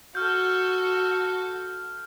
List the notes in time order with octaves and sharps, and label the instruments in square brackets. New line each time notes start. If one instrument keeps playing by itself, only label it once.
[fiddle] F#4 A4 [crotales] F6 G6